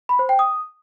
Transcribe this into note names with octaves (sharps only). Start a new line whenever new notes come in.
B5
C5
G5
D#6